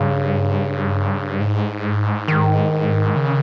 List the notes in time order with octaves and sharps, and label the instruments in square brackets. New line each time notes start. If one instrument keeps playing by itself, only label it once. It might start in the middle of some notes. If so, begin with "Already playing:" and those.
Already playing: [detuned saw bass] G2 [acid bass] C#3
[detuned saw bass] G#2
[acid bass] D#3
[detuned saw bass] C#3